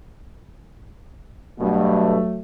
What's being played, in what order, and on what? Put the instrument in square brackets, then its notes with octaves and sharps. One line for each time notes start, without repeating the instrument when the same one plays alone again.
[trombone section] G2 B2 [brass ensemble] F#3 A3